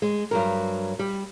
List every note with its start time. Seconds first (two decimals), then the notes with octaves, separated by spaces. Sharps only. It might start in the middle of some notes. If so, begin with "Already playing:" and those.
0.02 G#3
0.31 G2 F#3 A#4
0.99 G3